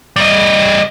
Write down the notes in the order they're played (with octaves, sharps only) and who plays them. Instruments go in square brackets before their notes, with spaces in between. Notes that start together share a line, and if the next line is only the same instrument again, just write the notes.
[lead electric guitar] G3 D#5